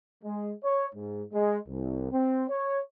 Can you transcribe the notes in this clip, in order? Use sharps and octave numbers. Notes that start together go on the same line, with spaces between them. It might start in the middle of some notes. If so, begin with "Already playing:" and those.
G#3
C#5
G#2
G#3
C2
C4
C#5